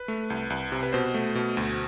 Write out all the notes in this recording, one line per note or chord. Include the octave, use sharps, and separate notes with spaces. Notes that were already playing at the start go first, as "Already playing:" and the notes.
Already playing: B4
A3
C2
C2
C3
B4
B2 C5
A3
B2
D2